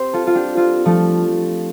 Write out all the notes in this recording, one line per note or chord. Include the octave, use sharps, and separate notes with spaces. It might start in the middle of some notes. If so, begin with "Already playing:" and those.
Already playing: C4 G4 C5
F4 A4
F4
D4 G4
C4 F4
F3 A3